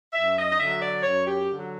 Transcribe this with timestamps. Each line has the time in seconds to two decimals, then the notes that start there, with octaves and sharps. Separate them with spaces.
0.13 F#2 E5
0.36 D#5
0.51 D#5
0.58 D3 E5
0.63 F#3
0.81 D5
1.03 F#2 C#5
1.26 G4
1.48 D3 F#3